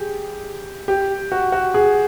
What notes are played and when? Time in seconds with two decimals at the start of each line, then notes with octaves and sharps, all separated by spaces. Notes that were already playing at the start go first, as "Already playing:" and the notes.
Already playing: G4 G#4
0.88 G4
1.32 F#4
1.52 F#4
1.74 G#4